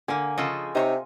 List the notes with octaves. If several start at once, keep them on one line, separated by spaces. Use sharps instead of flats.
D3 A#3 G#5
C#3 F3 F4 A4 D#5
C3 D#4 C5 C#5